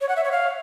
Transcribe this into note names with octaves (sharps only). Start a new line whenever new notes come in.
C#5
F#5
E5
C#5
F5